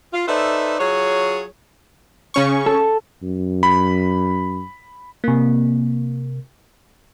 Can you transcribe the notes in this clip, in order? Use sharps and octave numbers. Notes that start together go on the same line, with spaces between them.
F4
D#4 A4 B4 C5 D5 E5
F#3 F4 G#4 C#5
C#3 C#4 C#6
A4
F#2
B5
C3 A#3